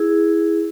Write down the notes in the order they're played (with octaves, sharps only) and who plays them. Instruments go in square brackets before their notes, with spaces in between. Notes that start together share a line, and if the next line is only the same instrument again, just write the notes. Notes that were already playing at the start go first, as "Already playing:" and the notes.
Already playing: [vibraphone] E4 G#4